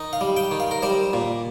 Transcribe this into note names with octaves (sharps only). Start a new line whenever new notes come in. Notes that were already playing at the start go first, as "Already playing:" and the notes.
Already playing: D#3 D#4
F5
G3
G5
D#3
F5
A#4
G3 C5
A#2